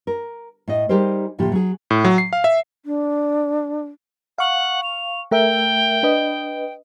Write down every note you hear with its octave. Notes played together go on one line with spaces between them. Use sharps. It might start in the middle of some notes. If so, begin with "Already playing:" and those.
A#4
A2 D#5
G3 D#4 G4 G#4 A#4 C5
D2 A2 F3 A#3 G4
F#3 G#4
A2
F#3
C7
F5
E5
D4
F5 F#5 C#6
F7
A3 A#4 E5 G5
D4 B4 D#5